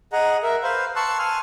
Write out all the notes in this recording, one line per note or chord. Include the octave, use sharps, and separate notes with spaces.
G#4 D#5 F#5 A#5
A#4 E5
B4 C5 F5
A5 C6 C#6 E6 F#6
G#5 C6 F6